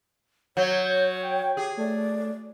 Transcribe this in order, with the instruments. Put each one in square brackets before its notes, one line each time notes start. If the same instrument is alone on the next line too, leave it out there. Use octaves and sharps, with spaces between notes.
[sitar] F#3 [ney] C#5 [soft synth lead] G6
[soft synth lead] G5
[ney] G4 [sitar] G#4
[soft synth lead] A3 [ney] D5